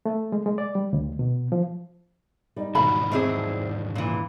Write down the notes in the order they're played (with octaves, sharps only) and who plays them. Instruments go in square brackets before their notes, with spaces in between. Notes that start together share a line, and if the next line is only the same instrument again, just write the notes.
[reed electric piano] A3
G#3
G#3
D5
G3
D2
B2
F3
[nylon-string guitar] G3 D#4
[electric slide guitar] E2 G#2 D#3 [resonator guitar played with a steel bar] B2 [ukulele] B5
[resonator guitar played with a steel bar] A2 C4 G#4 [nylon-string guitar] D#4 D5
[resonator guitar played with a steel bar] A#2 E3